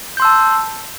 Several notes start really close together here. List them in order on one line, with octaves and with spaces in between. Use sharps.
G6 C6 E6 A5